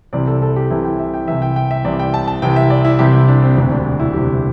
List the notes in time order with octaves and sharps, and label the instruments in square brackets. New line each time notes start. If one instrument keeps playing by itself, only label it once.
[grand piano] C2 C3 E3 D5
A4
A4
G4
C2 C3 E3 E4
G5
E5
G5
C2 C3 E3 E5
G5
G5
E5
C2 C3 E3 D5
G5
A5
A5
C2 C3 E3 G5
E5
D5
E4
C2 C3 E3 G4
E4
D4
C4
E1 D2 C3 C4
D4
E4
E1 D2 C3 G4